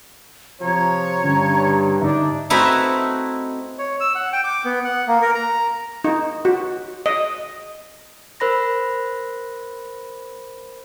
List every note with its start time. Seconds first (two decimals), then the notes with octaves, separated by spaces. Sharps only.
0.61 C3 F3 C#5 A#5
1.23 G2 D3 C#4
2.02 G#2 D3 D4 D#4 E5
2.50 A3 C4 D#4 E4 F#4 B4
3.78 C#5
4.00 E6
4.15 F#5
4.33 G5
4.44 D6
4.65 B3
4.84 F#5
5.08 A#3
5.22 A#4
5.35 A#5
6.04 D#4
6.45 F#4
7.06 D#5
8.40 A#4 C5 B5 A#6